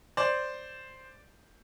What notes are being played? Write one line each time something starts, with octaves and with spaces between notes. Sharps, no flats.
C5 D5